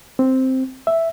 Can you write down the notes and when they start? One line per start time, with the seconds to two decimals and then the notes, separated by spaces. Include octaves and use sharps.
0.19 C4
0.87 E5